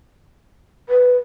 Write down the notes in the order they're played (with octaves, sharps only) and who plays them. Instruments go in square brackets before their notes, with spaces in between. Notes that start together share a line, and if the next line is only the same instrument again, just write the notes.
[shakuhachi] B4